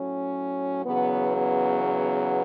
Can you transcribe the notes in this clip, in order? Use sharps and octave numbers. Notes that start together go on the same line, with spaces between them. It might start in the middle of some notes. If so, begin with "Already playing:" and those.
Already playing: A2 F#3 C#4
E2 C#3 F#3 B3
B3
B3